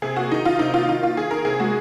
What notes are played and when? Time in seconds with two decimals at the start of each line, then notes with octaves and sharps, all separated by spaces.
0.02 C3 G#4
0.16 A#3 F#4
0.31 D#3 D#4
0.45 D#3 F4
0.59 C3 D#4
0.74 A#3 F4
0.88 D#3 F4
1.02 A#3 F4
1.17 D#3 G#4
1.31 D#3 A#4
1.45 C3 G#4
1.60 G#3 F#4